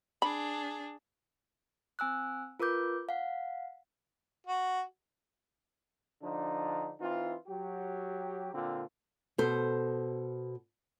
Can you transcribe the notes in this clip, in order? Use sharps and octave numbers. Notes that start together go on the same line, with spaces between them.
D4 G#4 B5
C4 G#5 E6 F#6
F4 A#4 B4 D6 G6
F5 F#5
F#4
D3 F3 D4 D#4
E3 C4 D#4 F4
F#3 G4
A#2 D3 C4 F4
B2 A4 C5